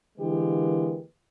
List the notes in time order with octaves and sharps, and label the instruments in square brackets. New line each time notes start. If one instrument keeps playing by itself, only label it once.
[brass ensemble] D3 E3 G#3 A#3 G4 B4